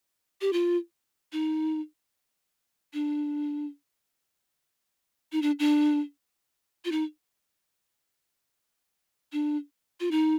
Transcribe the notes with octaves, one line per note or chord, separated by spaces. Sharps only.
G4
F4
D#4
D4
D#4
D4
D4
F4
D#4
D4
F4
D#4